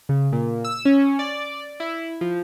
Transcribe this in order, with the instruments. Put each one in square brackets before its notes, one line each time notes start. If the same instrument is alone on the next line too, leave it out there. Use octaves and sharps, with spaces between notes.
[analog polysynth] C#3
A#2
E6
C#4
D5
E4
F3